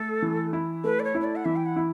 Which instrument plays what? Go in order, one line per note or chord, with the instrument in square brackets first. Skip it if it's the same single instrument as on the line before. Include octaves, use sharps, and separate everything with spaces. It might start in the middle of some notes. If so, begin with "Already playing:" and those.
Already playing: [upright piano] A3 [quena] A4
[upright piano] E3
E4
[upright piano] A3 [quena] B4
[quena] D5
C#5
[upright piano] E4
[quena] C#5
D5
F#5
[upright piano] E3 [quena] E5
[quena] G5
F#5
[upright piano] E4